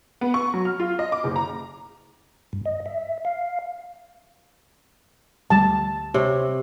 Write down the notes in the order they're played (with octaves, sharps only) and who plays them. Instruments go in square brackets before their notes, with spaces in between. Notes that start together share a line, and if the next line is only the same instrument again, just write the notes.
[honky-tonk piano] B3
C#6
F#3
F6
F4
D#5
D6
F#1
A#5
[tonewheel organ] G2
D#5
E5
F5
[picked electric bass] D2 G3 [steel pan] A5
[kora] C3 [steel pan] C#5